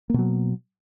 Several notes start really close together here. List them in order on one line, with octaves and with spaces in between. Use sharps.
A#3 B2 F#3